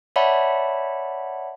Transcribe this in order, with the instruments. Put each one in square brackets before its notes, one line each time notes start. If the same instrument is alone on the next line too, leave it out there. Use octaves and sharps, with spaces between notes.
[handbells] C#5 D5 E5 F#5 A5 B5